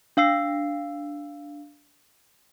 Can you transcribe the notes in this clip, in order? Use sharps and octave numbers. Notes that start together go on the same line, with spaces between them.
D4 F5 E6 C7